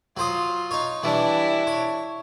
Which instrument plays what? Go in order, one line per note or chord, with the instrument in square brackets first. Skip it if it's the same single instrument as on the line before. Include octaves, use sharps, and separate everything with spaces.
[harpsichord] F#3 C5 D#6 [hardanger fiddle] F4
[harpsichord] D#4 C#5
[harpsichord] E3 G3 [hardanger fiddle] D4 E4
[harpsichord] C#5